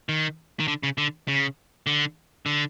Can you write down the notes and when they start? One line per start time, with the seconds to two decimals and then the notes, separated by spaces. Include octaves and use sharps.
0.09 D#3
0.60 D#3
0.68 D3
0.83 C#3
0.98 D3
1.28 C#3
1.87 D3
2.46 D3